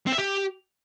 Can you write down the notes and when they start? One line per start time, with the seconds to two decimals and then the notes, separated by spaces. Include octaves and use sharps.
0.07 C4
0.12 E5
0.18 G4